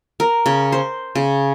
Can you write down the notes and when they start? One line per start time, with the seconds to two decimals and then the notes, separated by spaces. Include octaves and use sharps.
0.20 A#4
0.46 C#3
0.72 C5
1.15 C#3